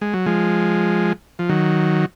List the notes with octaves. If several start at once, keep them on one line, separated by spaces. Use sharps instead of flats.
G#3
F#3
F3 G#3
F3
D#3 F#3